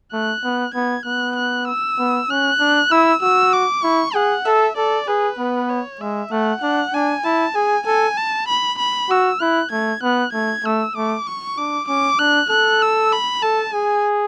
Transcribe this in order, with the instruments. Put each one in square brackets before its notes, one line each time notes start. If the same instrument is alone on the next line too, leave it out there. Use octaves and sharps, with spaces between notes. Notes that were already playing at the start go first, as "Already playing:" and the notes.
[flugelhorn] A3 [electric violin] F#6
[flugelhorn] B3
[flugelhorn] B3 [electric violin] G#6
[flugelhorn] B3 [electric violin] F#6
[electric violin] F#6
E6
[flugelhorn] B3
[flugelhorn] C#4 [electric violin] F#6
[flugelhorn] D4
[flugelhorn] E4 [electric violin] E6
[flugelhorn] F#4 [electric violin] E6
[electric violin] D6
[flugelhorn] E4 [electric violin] C#6
[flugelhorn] G#4 [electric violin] F#5
[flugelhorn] A4 [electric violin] E5
[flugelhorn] A4 [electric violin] D5
[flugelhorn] G#4 [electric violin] B4
[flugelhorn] B3
[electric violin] C#5
[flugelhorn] G#3 [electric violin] E5
[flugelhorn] A3 [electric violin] F#5
[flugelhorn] D4 [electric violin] F#5
[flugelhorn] D4 [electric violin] G#5
[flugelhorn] E4 [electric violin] A5
[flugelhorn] G#4 [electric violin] G#5
[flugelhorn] A4 [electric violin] G#5
[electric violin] A5
B5
B5
[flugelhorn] F#4 [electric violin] E6
[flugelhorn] E4 [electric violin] F#6
[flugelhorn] A3 [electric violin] G#6
[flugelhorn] B3 [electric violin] F#6
[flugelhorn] A3 [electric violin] G#6
[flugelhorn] A3 [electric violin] E6
[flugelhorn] A3 [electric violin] D6
[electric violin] C#6
[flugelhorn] D4 [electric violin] D6
[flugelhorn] C#4 [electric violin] D6
[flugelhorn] D4 [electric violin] F#6
[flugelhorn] A4 [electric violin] F#6
[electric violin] E6
B5
[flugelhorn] A4 [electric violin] A5
[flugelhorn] G#4 [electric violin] G#5